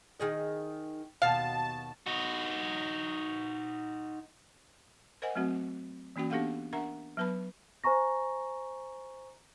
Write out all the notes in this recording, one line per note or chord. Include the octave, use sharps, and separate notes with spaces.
D#3 G#4 D#5
D#2 B2 F5 A5
D#4 F#4
A#4 C5 D#5 F#5 G#5
F#3 A3 C4 F#4
E3 A#3 C#4 F#4 G5
B3 D4 G4 A4 F5 F#5
D4 A#4 E5 F#5 A#5
F#3 B3 B4 A5 B5
C5 G#5 A#5 C#6 A#6